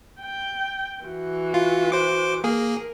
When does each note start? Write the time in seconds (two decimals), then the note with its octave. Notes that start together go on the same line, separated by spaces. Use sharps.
0.21 G5
1.05 E3 F#4
1.54 F4
1.92 C5 D6
2.44 A#3 G#4 A#4